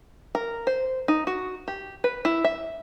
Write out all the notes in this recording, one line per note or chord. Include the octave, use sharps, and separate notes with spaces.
A#4
C5
D#4
F#4
G4
B4
E4
E5